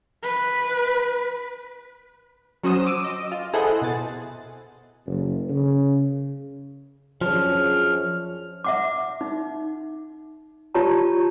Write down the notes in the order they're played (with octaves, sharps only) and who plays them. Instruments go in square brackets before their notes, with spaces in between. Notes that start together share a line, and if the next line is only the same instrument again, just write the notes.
[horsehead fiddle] B4
[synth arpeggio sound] F#3 C#4 F#4 C5 D#6 E7
D6 E6 D#7
D#5
F4
E4 G#4 A4 C5 D#5 F#5
B2 A6
[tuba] F#1
C#3
[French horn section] F#2 G#4 [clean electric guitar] F3 [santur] D4 C#5 [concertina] F6
[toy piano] E5 F#5 D6
D#4
F4 G4 C#5 A5 A#5